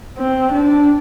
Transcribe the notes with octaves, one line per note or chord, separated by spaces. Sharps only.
C4
D4